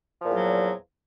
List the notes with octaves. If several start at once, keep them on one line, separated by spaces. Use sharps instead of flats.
E2 A#2 F3 F#3